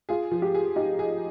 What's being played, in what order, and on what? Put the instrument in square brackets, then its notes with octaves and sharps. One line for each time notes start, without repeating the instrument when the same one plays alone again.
[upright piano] F4 [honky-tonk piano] G#4
[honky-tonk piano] F3
[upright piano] G4
[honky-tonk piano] G#4
[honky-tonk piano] D#4 [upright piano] G4
[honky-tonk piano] G#4